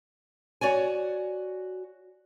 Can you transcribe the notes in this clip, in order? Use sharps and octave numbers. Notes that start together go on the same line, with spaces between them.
F#4 C#5 D5 G#5